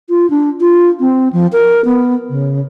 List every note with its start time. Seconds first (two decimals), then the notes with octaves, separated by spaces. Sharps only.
0.10 F4
0.30 D4
0.61 F4
1.00 C4
1.33 F3
1.53 A#4
1.85 B3
2.30 C#3